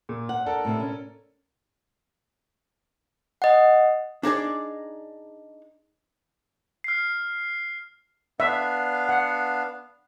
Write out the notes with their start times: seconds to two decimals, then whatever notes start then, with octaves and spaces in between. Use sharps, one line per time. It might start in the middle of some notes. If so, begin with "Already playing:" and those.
0.09 A#2
0.29 F#5
0.45 D4 A4 A#4
0.65 A2 C3 E5
0.79 C#4
3.42 D#5 F#5
4.23 D4 D#4 G#4 D5
6.84 F6 C7
8.40 B3 D4 E5 F5
9.09 F#5